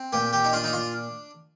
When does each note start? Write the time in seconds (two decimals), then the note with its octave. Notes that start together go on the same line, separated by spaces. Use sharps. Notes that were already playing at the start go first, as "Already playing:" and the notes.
Already playing: C4
0.13 A#2 G4
0.33 G4
0.44 D#4
0.53 D4 F4
0.64 D#4
0.73 F4